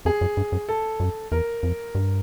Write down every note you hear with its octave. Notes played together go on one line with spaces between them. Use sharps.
F2 G#4
F#2
G2
F#2
A4
F#2
E2 A#4
F2
G2